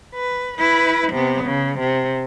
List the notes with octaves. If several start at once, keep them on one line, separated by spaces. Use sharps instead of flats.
B4
E4 B4
C3 B3
C#3
C3